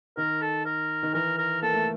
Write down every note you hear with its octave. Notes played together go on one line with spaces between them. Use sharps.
D#3 A#4
A4
A#4
D#3
E3 A#4
A#4
A#3 A4
A3